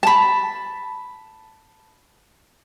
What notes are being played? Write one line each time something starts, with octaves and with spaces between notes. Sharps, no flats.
A5 B5